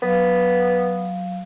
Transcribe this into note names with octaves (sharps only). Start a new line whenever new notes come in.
F#3 B3 F5